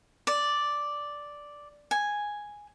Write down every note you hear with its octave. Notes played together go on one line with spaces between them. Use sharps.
D5
G#5